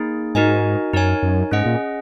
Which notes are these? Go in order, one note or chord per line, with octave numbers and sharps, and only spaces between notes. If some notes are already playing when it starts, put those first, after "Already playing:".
Already playing: A#3 D#4 G#4
G#2 D#4 F#4 A#4 D#5 G#5
F#2 D#4 A#4 C#5 G#5
F#2
G#2 C#4 G#4 D#5 F#5
A#2